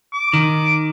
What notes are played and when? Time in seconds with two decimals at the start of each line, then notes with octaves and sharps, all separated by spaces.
0.13 D6
0.33 D#3